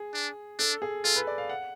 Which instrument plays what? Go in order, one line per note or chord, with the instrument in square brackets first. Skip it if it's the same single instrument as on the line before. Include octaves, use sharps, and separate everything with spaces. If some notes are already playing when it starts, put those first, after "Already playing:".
Already playing: [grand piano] G#4
[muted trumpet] D4
[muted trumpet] D4 [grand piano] A4
[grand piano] G#4
[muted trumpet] F4 [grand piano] A4
[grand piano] B4
D5
F5
F#5